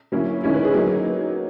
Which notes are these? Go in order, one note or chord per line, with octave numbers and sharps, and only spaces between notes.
F#3 A#3 C#4 E4
D#3 G#3 C#4 E4 C#5
B4
G#4
F#3 A#3 D#4